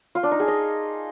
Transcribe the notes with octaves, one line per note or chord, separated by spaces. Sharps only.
F4
D4
D#4
G#4
D#5